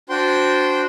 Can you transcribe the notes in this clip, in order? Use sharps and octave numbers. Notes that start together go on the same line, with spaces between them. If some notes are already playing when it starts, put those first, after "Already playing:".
D4 F#4 C5 G5 C6